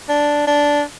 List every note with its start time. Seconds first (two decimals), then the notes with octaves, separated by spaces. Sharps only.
0.09 D4
0.47 D4